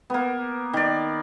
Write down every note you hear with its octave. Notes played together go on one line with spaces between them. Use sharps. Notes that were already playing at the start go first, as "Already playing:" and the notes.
A#3 B3
D#3 D5